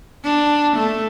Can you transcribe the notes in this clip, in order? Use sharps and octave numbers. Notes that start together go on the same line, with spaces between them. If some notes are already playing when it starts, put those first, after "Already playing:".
D4
A3